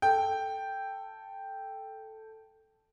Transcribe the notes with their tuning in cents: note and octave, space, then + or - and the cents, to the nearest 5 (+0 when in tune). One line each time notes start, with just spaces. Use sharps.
A4 +0 G5 +0